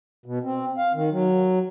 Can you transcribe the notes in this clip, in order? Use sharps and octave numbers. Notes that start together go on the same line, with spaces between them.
B2
C4
F5
D#3
F#3